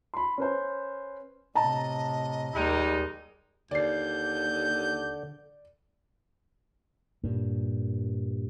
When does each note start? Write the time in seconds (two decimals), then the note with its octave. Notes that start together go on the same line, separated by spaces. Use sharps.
0.14 B5 C6
0.38 C#4 B4 C5
1.55 A2 C3 D#5 A5 A#5
2.54 D#2 G3 G#3 A#3 D#4
3.71 D#2 D3 D5 G6 C7
7.24 G2 A#2